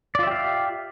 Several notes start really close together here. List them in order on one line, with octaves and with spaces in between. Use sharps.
D5 F4 E5 G4 F5